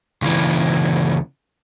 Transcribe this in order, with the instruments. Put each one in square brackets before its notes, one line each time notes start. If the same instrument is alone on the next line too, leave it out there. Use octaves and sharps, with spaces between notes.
[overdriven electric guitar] C#2 E3